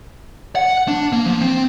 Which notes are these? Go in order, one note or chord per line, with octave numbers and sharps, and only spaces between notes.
F#5
D4
A#3
F3
C4